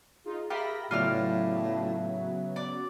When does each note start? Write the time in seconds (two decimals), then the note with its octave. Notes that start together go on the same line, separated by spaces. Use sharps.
0.25 D#4 F4 G#4
0.50 F4 G4 A#4 E5 B5 A#6
0.91 A2 C#3 F#3 B3 F4 D5 E5 F6
2.56 D5